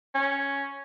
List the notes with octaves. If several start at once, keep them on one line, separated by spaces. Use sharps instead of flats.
C#4